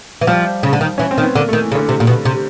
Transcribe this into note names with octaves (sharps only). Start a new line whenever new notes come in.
E3
F3 G3
C#3
D3
D#3
E3 C#4
C4
D#3
B3
D3 A#3
A3
D#3
E3
C#3
D3
C3
A#2
B2
C3